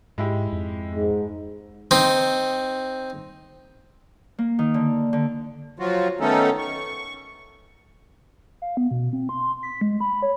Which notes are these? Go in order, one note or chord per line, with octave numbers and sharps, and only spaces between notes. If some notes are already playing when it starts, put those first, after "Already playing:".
G#2 G#3 E4 G4
F2
G#2
C4 D#4
A#3
D#3
D3
D3
F3 F#3 F4 F#4
D#3 A3 B3 C#4 D#4 A4
C#6
F5
B3
B2
C4
C6
B6
G#3
B5
C#5